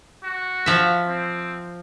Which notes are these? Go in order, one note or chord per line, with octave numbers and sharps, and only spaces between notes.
F#4
F3 E5
C4